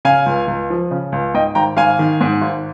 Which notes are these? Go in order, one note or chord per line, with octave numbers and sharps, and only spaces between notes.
C#3 F5 G#5
C#2
C#2
F3
C#3
C#2
G#2 D#5 G5
G#1 G5 A#5
G#1 F5 G#5
D#3
G#2
G#1